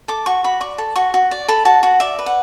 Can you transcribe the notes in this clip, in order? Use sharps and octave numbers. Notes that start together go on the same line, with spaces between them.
A4 D6
F#4 C#6
F#4 B5
D5 C#6
A4
F#4 C#6
F#4
D5
A4 B5
F#4 A5
F#4 F#5
D5 E5
B4
F#5